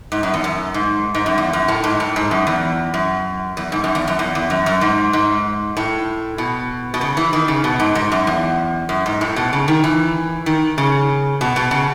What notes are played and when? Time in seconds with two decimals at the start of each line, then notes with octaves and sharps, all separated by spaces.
0.12 G#2
0.23 F#2
0.34 E2
0.44 F#2
0.74 G#2
1.15 G#2
1.26 F#2
1.38 E2
1.53 F#2
1.68 A2
1.84 G#2
2.00 A2
2.16 G#2
2.31 F#2
2.47 E2
2.94 F#2
3.57 E2
3.72 G#2
3.84 F#2
3.95 E2
4.08 F#2
4.19 E2
4.35 E2
4.50 F#2
4.66 F#2
4.81 G#2
5.13 G#2
5.77 A2
6.38 B2
6.94 B2
7.01 C#3
7.17 E3
7.33 D#3
7.48 C#3
7.64 B2
7.80 G#2
7.95 G#2
8.12 F#2
8.27 E2
8.89 F#2
9.06 G#2
9.21 A2
9.36 B2
9.53 C#3
9.68 D#3
9.84 E3
10.46 D#3
10.78 C#3
11.41 B2
11.56 B2
11.71 C#3